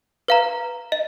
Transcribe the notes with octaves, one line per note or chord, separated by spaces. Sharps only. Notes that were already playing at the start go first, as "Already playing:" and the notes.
B4 F5 A#5
D#5